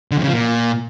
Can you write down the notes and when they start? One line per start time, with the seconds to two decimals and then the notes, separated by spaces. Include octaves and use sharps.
0.11 D3
0.17 F2
0.22 C#3
0.28 F3
0.33 A#2